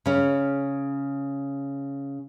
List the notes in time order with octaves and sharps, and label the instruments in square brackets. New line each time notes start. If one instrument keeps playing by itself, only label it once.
[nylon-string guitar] C#3 C#4